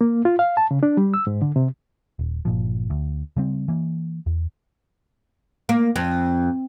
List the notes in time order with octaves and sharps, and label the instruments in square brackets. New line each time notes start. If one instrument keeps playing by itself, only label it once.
[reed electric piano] A#3
F4
F5
A5
C#3
D4
G3
E6
G#2
D3
C3
[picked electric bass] D#1
G1 A#2 F3
D2
C#3 G3 C4
E3 A#3
E2
[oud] A#3
F2